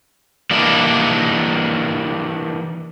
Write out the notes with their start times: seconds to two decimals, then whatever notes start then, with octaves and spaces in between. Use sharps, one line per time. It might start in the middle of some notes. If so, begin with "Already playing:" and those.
0.51 E3 G3 A#3 D4 D#4 D5